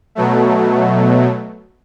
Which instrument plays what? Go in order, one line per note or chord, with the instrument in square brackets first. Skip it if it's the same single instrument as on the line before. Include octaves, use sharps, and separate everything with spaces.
[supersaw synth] B2 F#3 A3